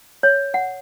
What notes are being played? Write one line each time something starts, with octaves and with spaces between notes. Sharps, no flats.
C#5
F#5